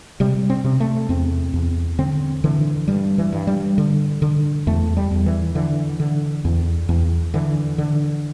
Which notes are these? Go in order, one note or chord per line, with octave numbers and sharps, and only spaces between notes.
C3 G3
C4
C3
A3
E2 C4
E2
D3 C4
D3 E3
G2 G3
E3
G2
G3
D3
D3
E2 A3
G3
E2
E3
D3 E3
D3
E2
E2
D3 E3
D3